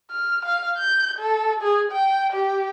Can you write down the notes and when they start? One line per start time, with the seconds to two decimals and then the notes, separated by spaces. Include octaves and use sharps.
0.11 F6
0.45 F5
0.78 G6
1.19 A4
1.62 G#4
1.92 G5
2.33 G4